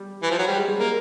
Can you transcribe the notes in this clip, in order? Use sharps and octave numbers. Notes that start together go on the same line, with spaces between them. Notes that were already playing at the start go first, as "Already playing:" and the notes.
Already playing: G3
E3
F3
F#3
G3 G#3
G#3
G3
G#3 A#3